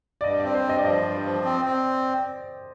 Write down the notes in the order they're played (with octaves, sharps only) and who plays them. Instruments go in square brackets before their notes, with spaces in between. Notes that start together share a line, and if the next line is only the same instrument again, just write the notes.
[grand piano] D5
[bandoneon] G2 [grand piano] D#5
[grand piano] D5
[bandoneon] C4
[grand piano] C5
[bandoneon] G2 [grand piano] D#5
[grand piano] D5
[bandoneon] F3 [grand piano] D#5
[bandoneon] G2
F3
C4
C4